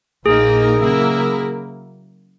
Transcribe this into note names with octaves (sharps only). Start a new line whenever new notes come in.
A#1 A#2 A#3 D#4 G#4 A#4
C#3 F#3 A#3 E4 A#4